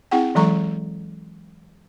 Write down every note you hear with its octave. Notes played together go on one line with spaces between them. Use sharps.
C4 E4 G#4 F#5 G5
E3 F#3 G#3 A4 A#5 C#6